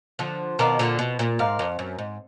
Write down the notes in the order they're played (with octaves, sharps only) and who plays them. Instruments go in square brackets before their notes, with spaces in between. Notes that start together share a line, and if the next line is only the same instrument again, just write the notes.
[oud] D3 F3
[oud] B2 D#3 [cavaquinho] A#4 D5 F5
[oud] A#2 D3
B2
A#2
[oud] G#2 [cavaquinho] A#4 D5 F5
[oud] F2
F#2
G#2